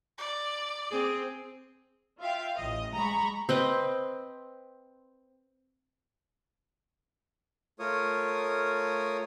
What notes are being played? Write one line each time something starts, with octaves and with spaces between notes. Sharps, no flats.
D5
C4 G#4
F4 E5 F5 G5
A1 D#5
G#3 A#5 B5 C#6
C4 B4 D#5
A3 F4 A#4 C#5 D#6